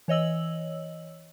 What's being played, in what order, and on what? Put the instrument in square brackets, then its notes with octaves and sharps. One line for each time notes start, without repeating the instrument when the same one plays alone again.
[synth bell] E3 C#5 D#5 E6 F#7